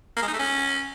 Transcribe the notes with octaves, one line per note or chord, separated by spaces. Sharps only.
A#3
G#3
D#4
A3
C#4